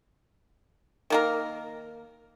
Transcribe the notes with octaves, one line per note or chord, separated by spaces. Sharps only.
D#3 A#3 A#4